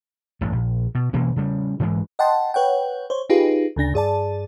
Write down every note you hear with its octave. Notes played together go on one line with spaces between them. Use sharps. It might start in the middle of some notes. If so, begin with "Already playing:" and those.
A1 G2
A#1
B2
B2 E3 A#3 C#4
C#3 G3
G#2 E3 G#3
D#5 F#5 G5 A5 C6
B4 C#5 F#5 G5
C5 C#5
D#4 F4 G4 G#4 B4
D2 C#3 D4 A#6
G2 G#4 D5 A5